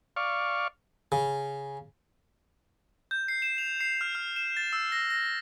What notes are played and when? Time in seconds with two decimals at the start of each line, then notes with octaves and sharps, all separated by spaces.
0.16 D5 F5 C#6
1.12 C#3
3.11 G6
3.28 C7
3.42 E7
3.58 F7
3.80 C7
4.01 F6
4.15 F6
4.36 E7
4.57 A6
4.73 E6
4.92 A#6
5.10 A#6